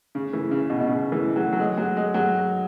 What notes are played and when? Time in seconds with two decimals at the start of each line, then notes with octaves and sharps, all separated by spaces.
0.15 C#3
0.33 E3
0.51 C#3
0.70 B2
0.81 B2
0.87 C#3
1.12 E3
1.36 F#3
1.53 F#3
1.60 G#3
1.78 F#3
1.97 G#3
2.14 F#3